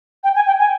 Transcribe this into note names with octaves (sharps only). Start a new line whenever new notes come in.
G5
G#5
G5
G#5